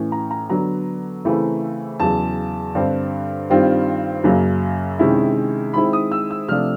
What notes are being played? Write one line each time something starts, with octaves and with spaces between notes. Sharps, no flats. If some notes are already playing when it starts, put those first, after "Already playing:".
Already playing: A2 E3 A3 C#4
A#5
A#5
D3 F#3 B3 A#5
C#3 E3 A3 C4 E4
E2 C#3 F#3 A5
G2 D3 G3 C4
G2 D#3 G3 C4 F4
F#2 C#3 F#3 A#3
C3 D#3 G#3 C#4 E4
D#3 G#3 C4 E4 B5
D#6
E6
E6
C3 F3 A3 D4 F6